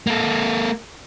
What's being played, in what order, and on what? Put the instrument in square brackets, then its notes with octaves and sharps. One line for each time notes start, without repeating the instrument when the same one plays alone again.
[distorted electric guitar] A#3 A4